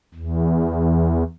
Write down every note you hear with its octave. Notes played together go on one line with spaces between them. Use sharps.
E2